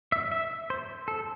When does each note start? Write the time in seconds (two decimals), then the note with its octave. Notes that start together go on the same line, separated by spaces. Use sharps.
0.12 E5
0.32 E5
0.70 C5
1.08 A4